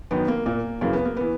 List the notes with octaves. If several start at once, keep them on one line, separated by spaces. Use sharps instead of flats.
F#2 D#3 B3
A#3
A#2 A#3
F#2 C#3 E3 A#3
B3
A#3
E3 B3